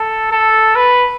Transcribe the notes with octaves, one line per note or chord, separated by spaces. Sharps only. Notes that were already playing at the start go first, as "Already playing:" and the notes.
Already playing: A4
A4
B4